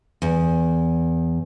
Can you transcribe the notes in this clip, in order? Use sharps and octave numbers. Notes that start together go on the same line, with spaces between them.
E2